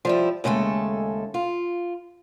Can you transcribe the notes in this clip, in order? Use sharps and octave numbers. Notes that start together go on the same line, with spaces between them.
F3 G3 E4
D#2 C#3 G#3 A3 A4
F4